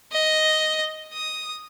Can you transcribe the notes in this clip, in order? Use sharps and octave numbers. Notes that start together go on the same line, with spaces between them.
D#5
D#6